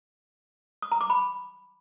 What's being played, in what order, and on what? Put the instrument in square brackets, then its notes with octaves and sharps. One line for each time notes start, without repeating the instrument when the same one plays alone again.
[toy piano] D#6
A#5
D6
B5